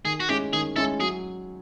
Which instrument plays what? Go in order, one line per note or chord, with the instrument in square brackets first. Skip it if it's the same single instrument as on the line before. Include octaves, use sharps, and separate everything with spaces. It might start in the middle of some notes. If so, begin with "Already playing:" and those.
[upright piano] D#3 [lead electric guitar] G#4
[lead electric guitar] F#4
[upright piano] G#3 C#4 E4 [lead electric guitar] G4
[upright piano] D#3 [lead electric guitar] G#4
[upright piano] G#3 C#4 E4 [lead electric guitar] A4
[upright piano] F#3 [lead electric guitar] G#4